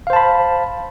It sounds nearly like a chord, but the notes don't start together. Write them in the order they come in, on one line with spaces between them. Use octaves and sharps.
F5 C5 A5 B5